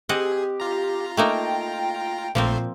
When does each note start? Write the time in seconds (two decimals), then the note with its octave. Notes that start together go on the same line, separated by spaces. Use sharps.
0.09 C4 G4 G#4 D#5 F#5
0.60 F4 A#5
1.17 A3 A#3 D#4 G5
2.35 A#1 A#2 F3 A3 A#3 C4 C5